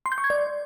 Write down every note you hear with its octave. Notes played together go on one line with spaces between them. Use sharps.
C6
G6
C#6
G#6
D5